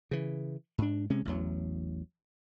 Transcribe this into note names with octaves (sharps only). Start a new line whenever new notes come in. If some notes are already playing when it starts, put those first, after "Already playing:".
C#3 E3
G#2 D4
C3 G#3 C#4
A1 E2 F#3